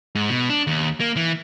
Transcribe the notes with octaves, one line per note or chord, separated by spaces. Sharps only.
G#2
B2
D4
D#2
A#3
E3